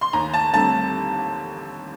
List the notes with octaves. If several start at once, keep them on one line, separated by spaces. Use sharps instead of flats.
C6
D#2 A#5
A5
D3 G3 C4 A5